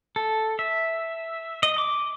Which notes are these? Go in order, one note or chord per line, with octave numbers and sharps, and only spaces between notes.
A4
E5
D#5
D6